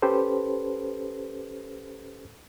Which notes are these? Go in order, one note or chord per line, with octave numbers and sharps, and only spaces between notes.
C#4 G4 A4 B4 C5